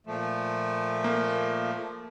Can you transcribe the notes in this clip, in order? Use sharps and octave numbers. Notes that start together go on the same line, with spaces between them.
A#2 F3 A3
A#3